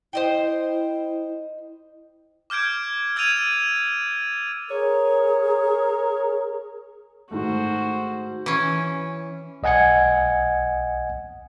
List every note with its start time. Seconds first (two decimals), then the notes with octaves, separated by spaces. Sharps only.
0.13 E4 C5 D#5 G5
2.50 D6 F6 G6 G#6 D7
3.16 E6 G#6 A6 D#7 F7
4.71 G#4 A#4 C#5
7.31 G#2 D#3 A3 F#4 C5
8.46 E3 C#4
9.63 B1 D#5 F#5 G#5 G#6 C#7